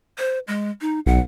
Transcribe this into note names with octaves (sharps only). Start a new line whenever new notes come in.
C5
G#3
D#4
B1 F#5